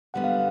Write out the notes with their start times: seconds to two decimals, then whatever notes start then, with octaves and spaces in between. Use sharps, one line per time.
0.14 F#2 D3 G3 B3 F#5
0.24 F5
0.34 F5